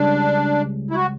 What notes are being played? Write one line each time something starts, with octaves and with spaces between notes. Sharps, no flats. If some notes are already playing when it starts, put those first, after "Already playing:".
Already playing: C#2 C#3 G3 D4
E4
F#4